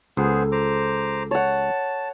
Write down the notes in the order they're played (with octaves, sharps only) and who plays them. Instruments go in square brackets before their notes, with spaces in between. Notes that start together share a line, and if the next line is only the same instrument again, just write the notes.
[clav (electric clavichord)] C#2 [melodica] B3 G#4 C5 [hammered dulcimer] A4
[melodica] C5 A#5 D6
[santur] C#5 F#5 [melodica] A5